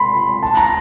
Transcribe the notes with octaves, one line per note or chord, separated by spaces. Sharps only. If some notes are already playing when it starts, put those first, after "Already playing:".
Already playing: B5 C6
A5
A#5